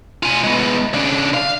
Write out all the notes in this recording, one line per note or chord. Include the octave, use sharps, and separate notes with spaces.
F4 G#5
G#3 B3
C#3 D4
F5